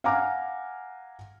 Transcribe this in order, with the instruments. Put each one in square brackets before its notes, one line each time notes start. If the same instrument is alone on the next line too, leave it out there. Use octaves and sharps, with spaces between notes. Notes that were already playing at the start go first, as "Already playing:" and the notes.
[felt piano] F5 F#5 G#5 A#5 D6 F6